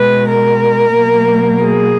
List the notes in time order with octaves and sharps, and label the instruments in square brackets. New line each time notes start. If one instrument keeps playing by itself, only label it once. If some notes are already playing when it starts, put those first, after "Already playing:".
Already playing: [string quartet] B2 G#3 B4
A#4
B2 F#3 A#3
G#4